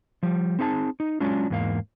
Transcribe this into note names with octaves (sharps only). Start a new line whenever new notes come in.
F3 G3
C4 D#4 G#4 E5 A5
D#4
F#3 G#3 C#4 D4 F4
E2 G#2 A#3 F5